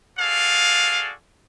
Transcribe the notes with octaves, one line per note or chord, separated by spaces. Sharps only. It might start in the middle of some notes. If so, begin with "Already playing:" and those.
F#4 G#4 A4 D5 F5